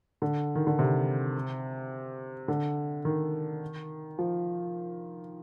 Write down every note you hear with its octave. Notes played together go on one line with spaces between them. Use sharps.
D3
D#3
D3
C3
D3
D#3
F3